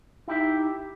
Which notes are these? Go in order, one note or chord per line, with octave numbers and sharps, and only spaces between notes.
D#4 E4 G4 E5